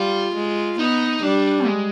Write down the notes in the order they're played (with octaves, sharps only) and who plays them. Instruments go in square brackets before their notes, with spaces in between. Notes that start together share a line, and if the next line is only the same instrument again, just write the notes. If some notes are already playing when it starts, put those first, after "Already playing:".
Already playing: [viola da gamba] G3 [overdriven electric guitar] F4
[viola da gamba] G#3
[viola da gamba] B3 [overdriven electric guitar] D#4
[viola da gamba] G3 [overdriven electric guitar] D4
[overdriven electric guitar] G#3